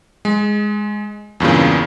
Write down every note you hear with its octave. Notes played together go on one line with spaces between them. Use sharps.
G#3
E2 G2 A#2 C#3